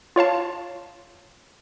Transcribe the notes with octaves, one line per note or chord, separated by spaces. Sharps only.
F4 C#5 F5 A5